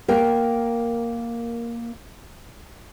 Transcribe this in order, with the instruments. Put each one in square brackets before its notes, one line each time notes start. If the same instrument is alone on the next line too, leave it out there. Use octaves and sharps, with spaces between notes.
[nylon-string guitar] A#3 A#4 G5